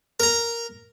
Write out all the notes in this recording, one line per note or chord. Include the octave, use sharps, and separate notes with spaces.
A#4 A#5